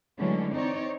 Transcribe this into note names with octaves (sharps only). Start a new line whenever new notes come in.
D3 E3 F#3 G#3 A3 C#4
C4 D#4 C#5 D5